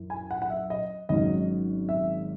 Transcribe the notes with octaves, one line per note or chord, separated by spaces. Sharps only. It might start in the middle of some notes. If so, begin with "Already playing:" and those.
Already playing: F#2 E3
G#5
F#5
F#5
E5
D#5
G#1 G#2 F#3 C#4 D#5
E5